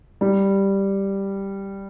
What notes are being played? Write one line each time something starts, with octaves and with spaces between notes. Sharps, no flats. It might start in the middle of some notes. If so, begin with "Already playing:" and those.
G3